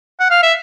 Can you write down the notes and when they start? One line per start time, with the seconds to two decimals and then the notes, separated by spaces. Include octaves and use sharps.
0.20 F#5
0.30 F5
0.43 E5